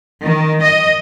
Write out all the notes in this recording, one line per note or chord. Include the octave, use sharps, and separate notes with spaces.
D#3
D#5